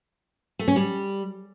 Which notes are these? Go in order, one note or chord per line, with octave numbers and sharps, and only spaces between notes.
A3
C#4
G3